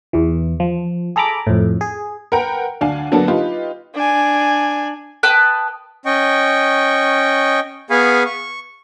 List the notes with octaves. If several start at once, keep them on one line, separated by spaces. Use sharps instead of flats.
E2 E3
F3
G#4 A4 A#5 B5 D6
F2 A2
G#4
A#4 B4 F#5 G5 A#5
D2 D4 F5 G#5
D3 F#3 A#3 B3 D4 A4
D#4 F4 G4 B4
D4 G#5
B4 G5 A5 D#6
C#4 D#5 G5 C#6
B3 G#4 F5 G#5 B5 C#6
C#6